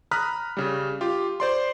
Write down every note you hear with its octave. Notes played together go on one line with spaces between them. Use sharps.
A#5 B5 D#6 F6 F#6 B6
C#3 G3
F4 G4
C5 D5 C6